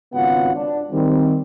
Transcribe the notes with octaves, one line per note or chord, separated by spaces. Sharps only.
G#1 C#3 B3 F4 F#4 F#5
D4
D#3 G3 C4